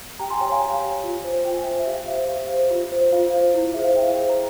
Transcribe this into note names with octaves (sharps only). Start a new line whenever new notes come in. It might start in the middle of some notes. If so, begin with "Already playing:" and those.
G4 G5 A#5
G#5 C6
C#5 G5 A#5
F5 G#5
G4
C#5
F4
C5
F4 G5
G#5
C5 E5 G5
E5
G4 F5
C5 E5
G4 F5
C5
F4
C5
F4 F5
C5
E4
G#4 C5 E5
F5
E4 E5 G5
G#4 C5
A#5